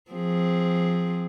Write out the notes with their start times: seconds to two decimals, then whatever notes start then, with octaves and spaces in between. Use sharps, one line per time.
0.11 F3 C4 G#4